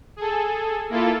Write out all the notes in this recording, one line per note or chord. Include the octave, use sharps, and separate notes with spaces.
G#4 A4
A#3 E4 F4 A4